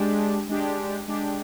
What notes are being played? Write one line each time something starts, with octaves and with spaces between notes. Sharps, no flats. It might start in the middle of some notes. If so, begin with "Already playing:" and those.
Already playing: G#3 D4 G4
G#3 D4 G4
G#3 D4 G4